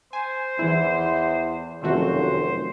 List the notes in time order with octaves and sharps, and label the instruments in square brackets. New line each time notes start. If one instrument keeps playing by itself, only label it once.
[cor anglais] C5 [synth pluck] G#5
[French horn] E2 [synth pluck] E3 E4
[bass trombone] F1 [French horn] F#2 [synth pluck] D#3 A3 F#4 [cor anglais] C5